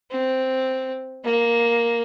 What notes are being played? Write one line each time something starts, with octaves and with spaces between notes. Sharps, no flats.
C4
A#3